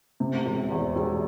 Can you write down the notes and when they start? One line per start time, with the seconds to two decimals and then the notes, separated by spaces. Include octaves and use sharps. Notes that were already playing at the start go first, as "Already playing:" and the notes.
0.20 C3
0.46 E1
0.71 E2
0.96 E1